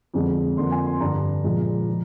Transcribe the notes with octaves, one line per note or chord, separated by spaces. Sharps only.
F2 D3 G#3
F2 D3 F3 A#3 C6
G#5
C6
G2 D3 G3 A#5
A#2 F3 G#3
F3